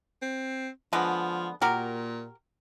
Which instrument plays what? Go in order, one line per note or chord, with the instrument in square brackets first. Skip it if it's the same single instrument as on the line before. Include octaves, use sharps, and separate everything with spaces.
[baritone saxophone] C4
[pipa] D3 G#3 B3 [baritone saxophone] F3
[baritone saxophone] A#2 [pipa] F#4 G4 A#4